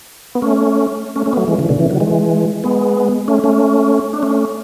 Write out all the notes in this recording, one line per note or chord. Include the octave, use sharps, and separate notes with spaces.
B3
A3 C#4
A3 C#4
A3 C#4
B3
F#3 A3
E3 G#3
C#3 E3
B2 D3
C#3 E3
D3 F#3
E3 G#3
G#3 B3
A3 C#4
A3 C#4
D4
A3 C#4